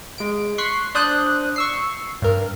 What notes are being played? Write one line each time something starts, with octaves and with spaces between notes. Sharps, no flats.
G#3 D7
C6 C#6 F#6 B6 C7
D4 C5 D5 D#6 F#6 G6
C#6 E6 C7
G2 A#4